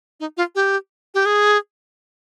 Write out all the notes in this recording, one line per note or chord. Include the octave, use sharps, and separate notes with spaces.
D#4
F4
G4
G4
G#4